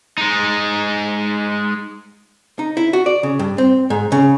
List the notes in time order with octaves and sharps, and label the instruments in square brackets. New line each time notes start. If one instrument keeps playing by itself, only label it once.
[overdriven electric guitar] G#3 D#4
[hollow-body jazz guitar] D#4
E4
F#4
D5
C#3
G2
C4
G#2
C#3